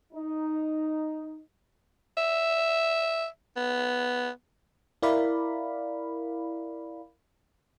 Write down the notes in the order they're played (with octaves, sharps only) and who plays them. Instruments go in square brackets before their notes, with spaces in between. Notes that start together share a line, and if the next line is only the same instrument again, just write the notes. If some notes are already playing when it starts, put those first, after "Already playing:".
[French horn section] D#4
[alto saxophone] E5
B3
[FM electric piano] E4 A#4 D5 F5 B5